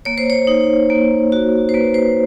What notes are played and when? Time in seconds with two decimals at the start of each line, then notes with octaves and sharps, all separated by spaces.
0.05 A#3 C#5
0.18 C5
0.30 C#5
0.47 D#4
0.90 A#3
1.32 F#4
1.69 C5
1.74 A#3 B4
1.94 C5